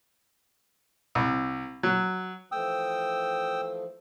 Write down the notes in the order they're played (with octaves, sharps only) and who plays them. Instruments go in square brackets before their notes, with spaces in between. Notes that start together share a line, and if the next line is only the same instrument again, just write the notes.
[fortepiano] C2
F#3
[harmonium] E3 F3 A3 [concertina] G5 D#6 E6